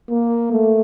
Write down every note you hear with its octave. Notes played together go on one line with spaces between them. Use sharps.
A#3
A3